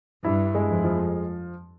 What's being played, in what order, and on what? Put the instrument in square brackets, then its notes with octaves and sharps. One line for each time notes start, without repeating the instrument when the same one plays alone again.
[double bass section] G2 [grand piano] E4
[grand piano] G#3
[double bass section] F2
[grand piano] F3